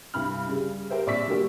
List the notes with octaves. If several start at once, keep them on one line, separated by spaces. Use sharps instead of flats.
C2 G2 B5 F6
C#3 G3
G4 A#4 C5 E5
A#1 C4 D5 C#6 E6 B6
D3 G3 A#3 F#4 G4